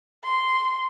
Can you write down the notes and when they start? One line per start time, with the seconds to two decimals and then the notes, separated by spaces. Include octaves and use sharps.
0.24 C6